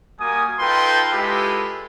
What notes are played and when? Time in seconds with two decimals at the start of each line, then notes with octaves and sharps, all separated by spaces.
0.19 G3 A#3 F#4 G#5 D#6
0.59 D#4 F4 A4 B4 G5 C6
1.13 G#3 E4 F4 G4 A4 B4